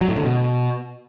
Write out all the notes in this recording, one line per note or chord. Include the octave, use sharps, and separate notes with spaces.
F#3
A2
D3
B2